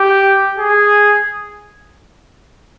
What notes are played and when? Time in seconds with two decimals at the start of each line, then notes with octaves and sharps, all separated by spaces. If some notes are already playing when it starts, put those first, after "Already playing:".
Already playing: G4
0.58 G#4